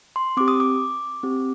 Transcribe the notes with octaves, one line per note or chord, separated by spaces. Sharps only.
C6
C4 G4 D6
D#6
D6
C4 G4